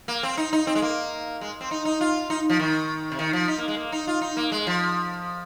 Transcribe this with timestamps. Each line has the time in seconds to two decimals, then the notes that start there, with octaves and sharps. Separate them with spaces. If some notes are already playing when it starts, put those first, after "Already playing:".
0.08 A#3
0.23 C4
0.37 D#4
0.53 D#4
0.67 C4
0.75 G#3
0.82 A#3
1.41 G#3
1.61 C4
1.71 D#4
1.85 D#4
2.01 F4
2.30 D#4
2.49 F3
2.59 D#3
3.12 C3
3.19 D#3
3.33 F3
3.48 D#4
3.58 A#3
3.68 G#3
3.77 A#3
3.92 D#4
4.07 F4
4.22 D#4
4.37 A#3
4.52 G#3
4.67 F3